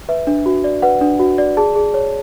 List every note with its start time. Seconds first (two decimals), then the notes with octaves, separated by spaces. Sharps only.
0.09 B4 E5
0.27 D4
0.46 F#4
0.64 D5
0.82 B4 F#5
1.01 D4
1.20 F#4
1.38 D5
1.57 G#4 A5
1.76 G#4
1.94 C#5